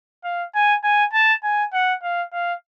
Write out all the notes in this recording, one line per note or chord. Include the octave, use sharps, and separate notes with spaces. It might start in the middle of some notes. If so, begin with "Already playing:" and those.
F5
G#5
G#5
A5
G#5
F#5
F5
F5